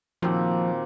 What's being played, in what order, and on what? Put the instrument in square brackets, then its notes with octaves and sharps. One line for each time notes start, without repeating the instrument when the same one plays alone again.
[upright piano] A#2 D#3 F#4 [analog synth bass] F3 [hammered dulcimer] A#3 C4